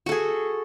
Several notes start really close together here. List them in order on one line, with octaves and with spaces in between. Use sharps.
F#4 A4 G#4